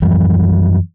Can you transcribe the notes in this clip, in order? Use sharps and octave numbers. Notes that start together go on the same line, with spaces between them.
F#2 E3 F3 G3